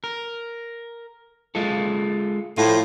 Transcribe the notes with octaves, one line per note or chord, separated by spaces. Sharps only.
A#4
G#3 F4 A4
A2 F4 C5